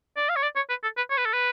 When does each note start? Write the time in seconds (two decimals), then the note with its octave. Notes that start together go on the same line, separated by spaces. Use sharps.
0.17 D5
0.29 F5
0.36 C#5
0.43 D5
0.56 C#5
0.69 B4
0.83 A4
0.97 B4
1.10 C#5
1.18 B4
1.26 A4
1.34 B4